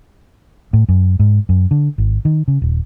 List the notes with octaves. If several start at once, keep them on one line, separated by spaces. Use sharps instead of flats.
A2
F#2
G#2
F#2
D3
G#1
D#3
C#3
D#1